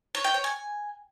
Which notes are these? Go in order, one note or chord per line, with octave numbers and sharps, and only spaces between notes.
C#5
G5
C#5
G#5